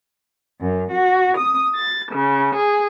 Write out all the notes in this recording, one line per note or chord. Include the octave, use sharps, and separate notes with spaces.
F#2
F#4
D#6
A6
C#3
G#4